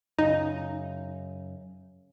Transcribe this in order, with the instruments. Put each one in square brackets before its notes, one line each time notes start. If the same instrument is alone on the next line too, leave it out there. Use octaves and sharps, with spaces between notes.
[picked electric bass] F#2 C#3 [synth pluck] D#4